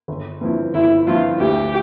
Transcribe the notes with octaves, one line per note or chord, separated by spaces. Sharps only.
G1
G2 F3 C4 E4
G1 E4
G2 F3 C4 E4 F4
D2 G4